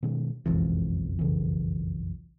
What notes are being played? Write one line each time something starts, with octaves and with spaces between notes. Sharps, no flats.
B2 D#3 G#3
F#1 B1 F2 E3 G#3
C#3 E3